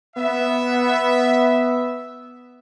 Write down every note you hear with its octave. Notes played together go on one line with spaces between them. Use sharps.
B3 E5